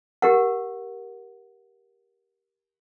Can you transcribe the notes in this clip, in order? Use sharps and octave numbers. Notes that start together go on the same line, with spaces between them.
G4 A#4 F#5